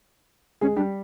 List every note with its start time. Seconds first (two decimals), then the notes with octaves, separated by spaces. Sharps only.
0.61 G#3 C#4 G#4
0.76 G3 D4 G4